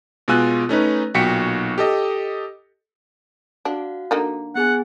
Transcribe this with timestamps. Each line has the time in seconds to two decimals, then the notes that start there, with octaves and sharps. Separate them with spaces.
0.28 B2 G#3 F4 G#5 E6 F#6
0.69 A3 C#4 D#4 B4
1.14 B1 A#2 F#4 G5 B6 C#7
1.78 G4 A4 D#5
3.65 D4 F#4 F5 F#5
4.11 D3 A#3 D#4
4.55 B3 G#4 F#5 G#5